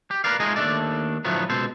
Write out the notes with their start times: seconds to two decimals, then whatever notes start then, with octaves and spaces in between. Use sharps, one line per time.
0.11 G4
0.24 A#4 B4 D5 F5
0.40 G#3 A3 D#4 F4 G#4 D#5
0.56 D#2 A3 D4 A4 D5
1.25 D2 A2 F3 F#3 A3 B3
1.49 C#2 B2 A4 C5